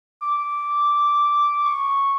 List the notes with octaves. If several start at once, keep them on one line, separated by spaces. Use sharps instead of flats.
D6
C#6